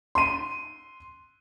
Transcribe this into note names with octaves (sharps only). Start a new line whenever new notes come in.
C6 D#7